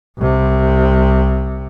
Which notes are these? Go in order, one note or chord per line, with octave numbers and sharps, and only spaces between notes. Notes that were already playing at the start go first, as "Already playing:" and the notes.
C2 C3